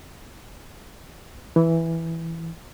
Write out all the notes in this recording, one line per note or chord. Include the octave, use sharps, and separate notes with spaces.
E3